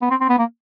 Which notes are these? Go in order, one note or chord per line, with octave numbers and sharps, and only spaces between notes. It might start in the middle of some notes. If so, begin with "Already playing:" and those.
B3
C4
C4
B3
A#3